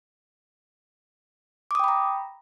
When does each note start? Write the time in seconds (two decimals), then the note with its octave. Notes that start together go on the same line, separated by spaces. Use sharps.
1.71 D6
1.75 D#6
1.79 G5
1.84 B5
1.88 A#5